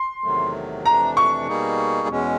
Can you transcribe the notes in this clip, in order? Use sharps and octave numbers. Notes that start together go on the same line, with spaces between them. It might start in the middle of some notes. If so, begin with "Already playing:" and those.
Already playing: C6
E2 C3 D#3 F#3 A3
F2 C3 E3 A3 D4 A#5
C#6
B2 G3 A#3 D#4 G#4
E2 B2 G#3 C#4